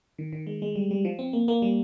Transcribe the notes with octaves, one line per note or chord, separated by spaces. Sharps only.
D#3
D#3
G#3
G#3
G3
G3
F3
C4
A#3
A#3
G3